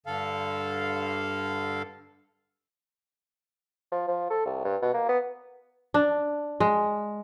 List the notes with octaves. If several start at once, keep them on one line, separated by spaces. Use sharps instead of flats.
G2 D3 A4 F5
F3
F3
A4
C2
G2
B2
A#3
B3
D4
G#3